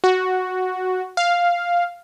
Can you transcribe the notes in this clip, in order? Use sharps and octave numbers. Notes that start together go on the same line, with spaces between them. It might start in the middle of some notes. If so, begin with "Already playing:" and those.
F#4
F5